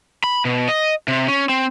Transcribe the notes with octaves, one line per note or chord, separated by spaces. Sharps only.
B5
B2
D#5
C3
C#4
C4